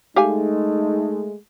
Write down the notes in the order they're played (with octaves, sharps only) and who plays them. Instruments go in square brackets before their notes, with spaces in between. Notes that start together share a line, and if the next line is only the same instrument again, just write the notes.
[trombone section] G#3 A3 [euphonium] D#4 [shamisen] G4 F5 G#5